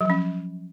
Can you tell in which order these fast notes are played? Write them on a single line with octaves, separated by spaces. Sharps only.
F#3 F3 C#4